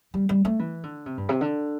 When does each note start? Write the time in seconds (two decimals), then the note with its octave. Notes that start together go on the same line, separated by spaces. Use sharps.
0.14 G3
0.29 G3
0.45 A3
0.59 E3
0.83 D3
1.06 C3
1.17 G2
1.29 C3
1.41 D3